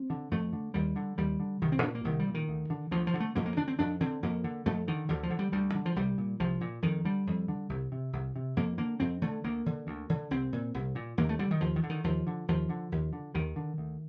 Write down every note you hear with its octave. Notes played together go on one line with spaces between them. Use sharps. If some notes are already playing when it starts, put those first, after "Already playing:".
Already playing: C4
D3
F2 A3
D3
D#2 G3
D3
D#2 G3
D3
C2 D#3
C4
A#2 D4
A#3
C2 D#3
G3
A#2
D#3
D2
D3
D2 F3
F3
D3
A3
F2 A#3
A#3
D3 D4
C4
F2 D4
D3 C4
F2 A#3
D3
F2 A3
D3 D#3
D2 D3
F3
D3
G3
D2 G3
D3
F3
C2 G3
A#2
C2 F3
A#2
F2 D#3
D3 G3
F2
D3
C2
C3
C2
C3
F2 A#3
D3 A#3
F2 C4
D3 A3
D2 A#3
D3
D2
D3
C2 C4
A#2
C2
A#2
D#2 A#3
A3
D3 G3
D#3
D#2 F3
D#3
D3
D#3
D#2 F3
D3
D#2 F3
D3
D#2
D3
D#2 D#3
D3
D2